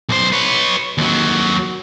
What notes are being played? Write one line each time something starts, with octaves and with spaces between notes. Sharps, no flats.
B1 C5
B4 C#5
D#2 F#3